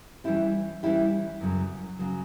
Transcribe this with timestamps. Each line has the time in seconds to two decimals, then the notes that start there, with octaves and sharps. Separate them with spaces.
0.24 E3 G3 C#4 E4 G4
0.83 E3 G3 C#4 E4 G4
1.41 F#2 C#3 F#3
1.99 C#3 F#3